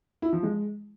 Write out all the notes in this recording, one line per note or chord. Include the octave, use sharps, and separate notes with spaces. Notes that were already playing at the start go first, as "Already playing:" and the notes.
E4
F3
G#3